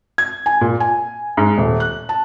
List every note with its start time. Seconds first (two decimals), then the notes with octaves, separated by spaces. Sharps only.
0.18 G#6
0.46 G#5
0.61 A#2
0.80 G#5
1.37 G#2
1.58 D#1
1.80 F#6
2.09 A5